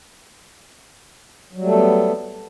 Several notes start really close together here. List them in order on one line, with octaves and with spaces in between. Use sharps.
F#3 G3 A3 A4 B3